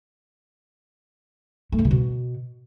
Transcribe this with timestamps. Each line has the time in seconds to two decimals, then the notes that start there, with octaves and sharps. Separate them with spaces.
1.72 A3
1.79 G#2
1.85 C3
1.91 B2